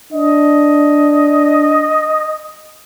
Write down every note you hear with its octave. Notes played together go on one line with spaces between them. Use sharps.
D4 D#5